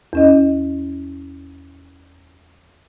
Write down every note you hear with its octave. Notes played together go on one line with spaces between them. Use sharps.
E2 C#4 D#5